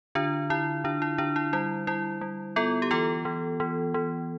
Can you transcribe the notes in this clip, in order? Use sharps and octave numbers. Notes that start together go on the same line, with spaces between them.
D3 D4 F4
D3 E4
D3 D4
E4
D3 D4
E4
G3 E4
G3 E4
G3
B3 F4 A4
G4
E3 F4 A4
E3
E3
E3